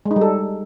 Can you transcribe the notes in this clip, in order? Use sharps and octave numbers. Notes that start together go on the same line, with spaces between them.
G#3
D#4
G3
A4